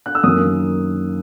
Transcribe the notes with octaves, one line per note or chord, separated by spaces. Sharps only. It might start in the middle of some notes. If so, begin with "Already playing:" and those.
F#6
E6
F#2 D#3 A#3 D#6